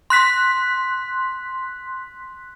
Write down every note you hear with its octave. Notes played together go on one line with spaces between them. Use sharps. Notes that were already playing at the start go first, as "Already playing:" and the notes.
C6 F#6 B6